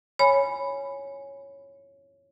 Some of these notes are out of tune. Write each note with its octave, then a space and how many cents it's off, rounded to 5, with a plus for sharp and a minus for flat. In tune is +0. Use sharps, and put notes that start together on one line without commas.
C#5 +0 G#5 +0 B5 +0